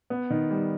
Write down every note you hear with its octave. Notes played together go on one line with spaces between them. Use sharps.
B3
D#3
G3